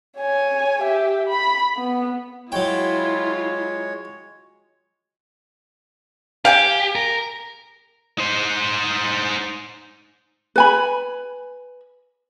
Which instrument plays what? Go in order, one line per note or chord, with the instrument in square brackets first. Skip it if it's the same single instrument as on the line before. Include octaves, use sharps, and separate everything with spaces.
[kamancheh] C#5 G#5
G4 E5
B5
B3
[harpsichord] F#3 G5 [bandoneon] G#3 C#5 [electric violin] E4 F4
[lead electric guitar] G4 [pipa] F5 G5 G#5
[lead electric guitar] A#4
[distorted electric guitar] D#4 C5
[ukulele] B4 G#5 B5